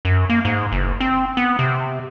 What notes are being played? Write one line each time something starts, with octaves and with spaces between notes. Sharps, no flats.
F#2
A#3
G#2
F#1
C4
B3
C3